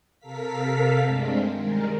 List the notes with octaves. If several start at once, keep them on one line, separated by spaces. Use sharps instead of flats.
C3 A4 A#4 F5 B6
G2 G#3 A3 C4 D4
D#3 G3 G#3 A#4